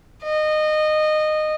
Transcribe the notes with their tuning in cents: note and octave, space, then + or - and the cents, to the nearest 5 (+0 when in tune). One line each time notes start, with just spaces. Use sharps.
D#5 -20